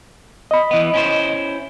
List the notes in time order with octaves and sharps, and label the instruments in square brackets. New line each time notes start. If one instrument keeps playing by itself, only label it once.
[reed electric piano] D#5 B5
[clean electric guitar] E3 B3
C#4 E4 C5